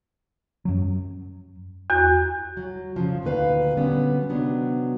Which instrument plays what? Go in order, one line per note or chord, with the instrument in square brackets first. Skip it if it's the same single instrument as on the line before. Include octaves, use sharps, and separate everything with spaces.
[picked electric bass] F#2 F#3
[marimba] E2 F#4
[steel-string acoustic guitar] F#3
F2 C#3 F3
D2 A#2 D#3 B4 F5
D3 F#3 G3 B3 C#4
C3 D#3 F#3 B3 D4